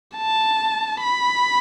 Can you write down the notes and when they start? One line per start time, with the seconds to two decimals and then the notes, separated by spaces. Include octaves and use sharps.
0.16 A5
1.01 B5